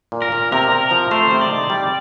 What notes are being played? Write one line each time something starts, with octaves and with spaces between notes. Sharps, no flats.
A#2
A#4
A#2
C3 A#4
C3
A#4
F3
A3 C5
C3
D5
D#4
G3